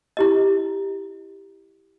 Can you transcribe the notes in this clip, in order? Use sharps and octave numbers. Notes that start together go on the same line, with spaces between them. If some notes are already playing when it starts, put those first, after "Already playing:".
E4 G4 D#5